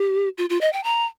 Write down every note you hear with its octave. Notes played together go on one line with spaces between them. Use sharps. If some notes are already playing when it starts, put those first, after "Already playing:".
Already playing: G4
F4
F4
D#5
G5
A#5